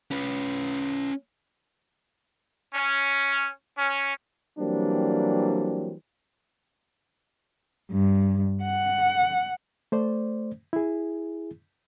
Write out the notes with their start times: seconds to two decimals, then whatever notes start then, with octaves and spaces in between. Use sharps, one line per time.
0.11 C#4 B4
2.75 C#4
3.78 C#4
4.59 E3 F#3 G3 A#3 C4 D4
7.92 G2
8.63 F#5
9.92 A3 C5 D5
10.73 E4 G#4